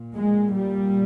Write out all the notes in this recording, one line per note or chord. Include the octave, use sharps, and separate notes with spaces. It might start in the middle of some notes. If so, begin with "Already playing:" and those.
Already playing: A#2
G#3
G3